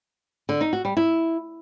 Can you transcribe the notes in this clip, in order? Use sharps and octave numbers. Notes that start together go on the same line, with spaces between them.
D3
D#4
F#4
G3
E4